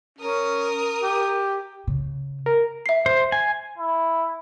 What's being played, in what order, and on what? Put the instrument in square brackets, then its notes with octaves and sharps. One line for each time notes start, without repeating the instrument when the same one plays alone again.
[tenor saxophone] C#4 [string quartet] A#4 D#6
[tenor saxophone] G4
[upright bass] C#3
[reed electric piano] A#4
[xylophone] E5 C7
[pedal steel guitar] C5
G#5
[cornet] E4